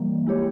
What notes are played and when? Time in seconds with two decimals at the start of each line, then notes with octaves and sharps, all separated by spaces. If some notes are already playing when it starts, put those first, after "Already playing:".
Already playing: E3 G3 A#3
0.26 G#3 E4 G4 C#5